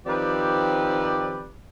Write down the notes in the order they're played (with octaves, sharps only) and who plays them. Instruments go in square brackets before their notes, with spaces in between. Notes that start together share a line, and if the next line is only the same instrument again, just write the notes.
[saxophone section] D#3 F3 C4 G4 B4 D5